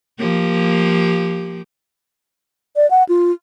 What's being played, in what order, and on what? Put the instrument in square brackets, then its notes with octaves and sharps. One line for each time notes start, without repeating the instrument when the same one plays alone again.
[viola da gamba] F3 A#3 G4
[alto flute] D5
F#5
F4